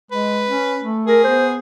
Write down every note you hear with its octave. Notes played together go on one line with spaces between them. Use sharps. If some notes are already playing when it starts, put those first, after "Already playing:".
G#3 B4
C#4
A3
G#4 A#4
B3 C5